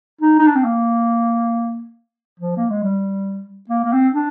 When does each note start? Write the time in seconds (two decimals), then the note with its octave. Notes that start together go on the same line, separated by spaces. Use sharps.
0.21 D#4
0.39 D#4
0.47 D4
0.56 C4
0.64 A#3
2.40 F3
2.57 A#3
2.70 G#3
2.83 G3
3.70 A#3
3.84 A#3
3.93 C4
4.14 D4